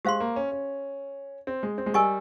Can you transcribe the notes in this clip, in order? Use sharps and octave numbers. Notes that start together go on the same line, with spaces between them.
G#3 G4 C5 F5 C6
A#3
C#4
C#4
C4
G#3
C4
G#3
G3 A#4 D#5 G#5 C#6